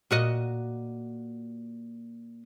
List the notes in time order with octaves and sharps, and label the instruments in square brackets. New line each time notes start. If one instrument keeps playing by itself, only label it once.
[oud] A#2 F#4 D#5